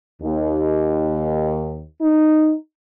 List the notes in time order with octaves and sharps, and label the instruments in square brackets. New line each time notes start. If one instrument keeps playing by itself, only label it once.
[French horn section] D#2
D#4